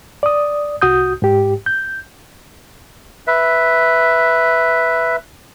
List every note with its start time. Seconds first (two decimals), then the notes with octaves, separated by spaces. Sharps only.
0.23 D5 D#6
0.82 C2 F#4 D#6 G6
1.22 G#2 G4
1.66 G6
3.27 B4 E5